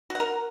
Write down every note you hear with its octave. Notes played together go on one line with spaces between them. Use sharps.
F#4 A#4 F#5